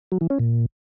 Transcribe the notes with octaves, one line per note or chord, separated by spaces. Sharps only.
F#3
E3
C#4
A#2